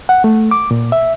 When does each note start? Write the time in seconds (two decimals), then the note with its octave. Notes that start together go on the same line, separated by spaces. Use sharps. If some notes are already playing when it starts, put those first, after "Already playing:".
0.09 F#5
0.24 A3
0.51 D6
0.71 A#2
0.92 E5